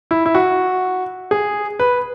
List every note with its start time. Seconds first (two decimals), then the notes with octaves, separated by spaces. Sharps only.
0.11 E4
0.26 E4
0.35 F#4
1.31 G#4
1.79 B4